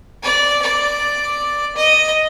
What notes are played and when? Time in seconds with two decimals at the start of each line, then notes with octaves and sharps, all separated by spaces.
0.23 D5
0.62 D5
1.76 D#5